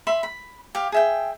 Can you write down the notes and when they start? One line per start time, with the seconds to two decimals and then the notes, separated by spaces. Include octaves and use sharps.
0.07 E5 B5 C6
0.23 B5
0.75 G4 F5
0.92 G#4 E5 G5